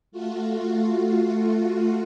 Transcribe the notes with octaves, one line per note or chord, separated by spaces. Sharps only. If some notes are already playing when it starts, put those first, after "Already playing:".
A3 F4 F#4